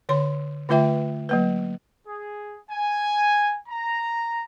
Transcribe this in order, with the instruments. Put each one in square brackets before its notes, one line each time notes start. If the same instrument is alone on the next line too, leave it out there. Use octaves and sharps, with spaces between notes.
[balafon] D3 C#5 C6
D3 A3 F4 B4 E5 G5
F#3 A#3 B4
[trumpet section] G#4
G#5
A#5